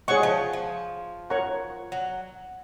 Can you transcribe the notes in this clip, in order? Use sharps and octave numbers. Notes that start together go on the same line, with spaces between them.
G#3 G#4 C#5 F#5 C#6
F3
F3
A#4 C#5 F#5 A#5 C#6
F#3